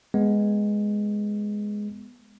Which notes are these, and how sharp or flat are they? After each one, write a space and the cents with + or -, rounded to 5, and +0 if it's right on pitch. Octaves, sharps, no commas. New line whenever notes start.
G#3 +0 B3 +0